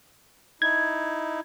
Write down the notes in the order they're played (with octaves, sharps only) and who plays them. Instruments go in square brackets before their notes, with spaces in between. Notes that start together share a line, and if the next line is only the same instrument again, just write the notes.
[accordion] D#4 E4 [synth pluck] G#6